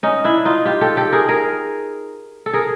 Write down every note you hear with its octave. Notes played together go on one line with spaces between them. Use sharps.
C#4 D#4
D4 E4
D#4 F4
F4 G4
G4 A4
G4 A4
G#4 A#4
G#4 A#4
A4
G#4 A#4